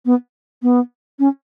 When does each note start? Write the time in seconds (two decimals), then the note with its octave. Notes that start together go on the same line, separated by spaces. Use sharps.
0.05 B3
0.62 B3
1.19 C#4